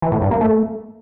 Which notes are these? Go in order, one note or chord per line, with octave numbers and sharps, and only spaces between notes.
E3
A2
G2
A#3
A3